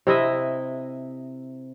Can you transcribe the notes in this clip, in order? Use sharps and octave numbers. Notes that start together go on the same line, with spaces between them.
C3 E4 D#5 E5